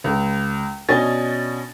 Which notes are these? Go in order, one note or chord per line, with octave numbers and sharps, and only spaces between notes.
C#2
B2 C#4 D4 D#5 G#5 A6